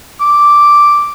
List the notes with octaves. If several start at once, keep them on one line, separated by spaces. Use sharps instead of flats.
D6